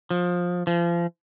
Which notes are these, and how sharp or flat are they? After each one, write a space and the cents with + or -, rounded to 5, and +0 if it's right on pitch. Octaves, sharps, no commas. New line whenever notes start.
F3 +20
F3 -30